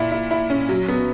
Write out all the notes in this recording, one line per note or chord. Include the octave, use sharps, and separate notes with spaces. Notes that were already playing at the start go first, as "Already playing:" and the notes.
Already playing: A#2 E4
E4
E4
C#4
F#3
B3